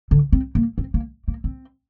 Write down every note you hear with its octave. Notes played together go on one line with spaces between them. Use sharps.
D3
C4
A#3
C4
A#3
A#3
C4